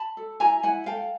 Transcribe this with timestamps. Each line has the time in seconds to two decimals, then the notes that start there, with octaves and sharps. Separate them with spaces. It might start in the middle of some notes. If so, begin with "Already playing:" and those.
Already playing: A5 B5
0.17 A4
0.40 E4 G#5 A#5
0.63 E4 F#5 G#5
0.86 A4 F5 G5